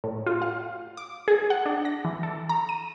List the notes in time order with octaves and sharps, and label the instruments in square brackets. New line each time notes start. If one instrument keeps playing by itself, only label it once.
[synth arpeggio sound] A2
F4
F5
D6
G#4
F#5
D4
A#6
E3
A4
A#5
D#7